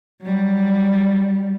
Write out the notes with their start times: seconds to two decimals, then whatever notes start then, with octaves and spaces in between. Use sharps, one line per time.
0.22 F#3 G3